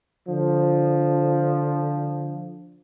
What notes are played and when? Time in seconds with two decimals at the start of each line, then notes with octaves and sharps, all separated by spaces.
0.27 D3 F3